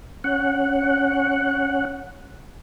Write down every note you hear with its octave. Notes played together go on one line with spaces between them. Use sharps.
C#4 F#5